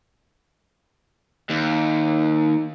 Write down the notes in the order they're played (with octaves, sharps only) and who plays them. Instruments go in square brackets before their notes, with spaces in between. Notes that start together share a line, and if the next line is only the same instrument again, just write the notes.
[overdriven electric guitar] D#2